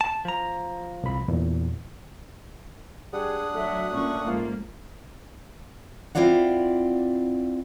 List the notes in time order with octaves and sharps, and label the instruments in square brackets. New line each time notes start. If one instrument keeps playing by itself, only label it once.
[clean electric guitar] A5
F3 A#5
[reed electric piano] C2 B5
E2 A#2
[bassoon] G3 [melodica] D4 F#5 D#6 [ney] G#4
[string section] F#3 [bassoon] A3 [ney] E5
[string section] A#2 C#4 [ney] C#6
[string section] G#2 F3 A#3 [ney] F4
[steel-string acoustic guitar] C4 E4 F4 D5 F#5